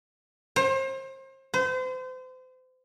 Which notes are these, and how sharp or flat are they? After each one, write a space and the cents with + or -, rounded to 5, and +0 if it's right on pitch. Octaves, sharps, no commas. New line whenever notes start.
C5 +35
C5 -35